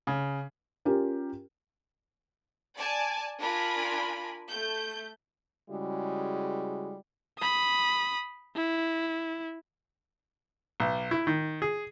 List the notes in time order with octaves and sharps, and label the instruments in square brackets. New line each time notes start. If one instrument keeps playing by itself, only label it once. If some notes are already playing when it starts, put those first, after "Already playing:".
[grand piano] C#3
[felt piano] C#4 F4 G4 A#4
[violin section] D5 G#5 A5
D4 F4 A#4 G#5 B5
A3 G6
[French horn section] C#3 G3 G#3 E4 F#4
[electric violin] B5 D#6
E4
[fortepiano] B1
E4
D#3
G#4